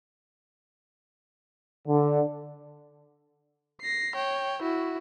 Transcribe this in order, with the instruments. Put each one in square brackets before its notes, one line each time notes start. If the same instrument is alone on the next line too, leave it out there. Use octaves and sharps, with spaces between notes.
[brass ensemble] D3
[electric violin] A#6 C7
C#5 G5
E4 F#4